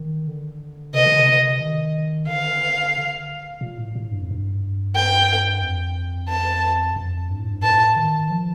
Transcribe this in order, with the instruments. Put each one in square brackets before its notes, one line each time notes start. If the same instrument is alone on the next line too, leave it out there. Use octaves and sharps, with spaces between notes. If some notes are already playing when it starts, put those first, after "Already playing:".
Already playing: [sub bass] D#3
D3
[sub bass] C3 [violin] D#5
[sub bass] D3
C3
D#3
[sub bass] D3 [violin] F5
[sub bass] A#2
A2
A2
G2
F2
G2
[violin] G5
[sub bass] F2
[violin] A5
[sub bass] F2
G2
A2
G2
[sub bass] A2 [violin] A5
[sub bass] A#2
A2
D#3
F3